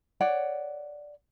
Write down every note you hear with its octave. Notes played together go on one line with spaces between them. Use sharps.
C#5 D5 F#5